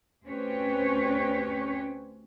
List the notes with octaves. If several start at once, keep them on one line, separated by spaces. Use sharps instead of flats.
D2 C4 C#4 G4 B4 C#5